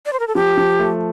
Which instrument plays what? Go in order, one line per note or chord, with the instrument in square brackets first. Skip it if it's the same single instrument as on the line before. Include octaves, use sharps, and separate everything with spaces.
[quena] D5
C5
A#4
A4
[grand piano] F3 [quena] G4
[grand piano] F3
A3